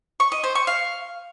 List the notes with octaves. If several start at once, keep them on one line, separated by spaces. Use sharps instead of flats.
C#6
D#5
C5
C#6
F5